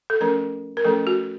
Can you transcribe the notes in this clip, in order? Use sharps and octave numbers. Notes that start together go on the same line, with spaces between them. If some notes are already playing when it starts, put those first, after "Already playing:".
A4
F3 A3 C#4 A#4
A#4
F3 A3 C#4 A4
F#4